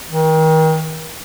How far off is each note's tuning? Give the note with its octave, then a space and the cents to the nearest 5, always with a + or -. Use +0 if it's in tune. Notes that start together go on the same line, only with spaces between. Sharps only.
D#3 +35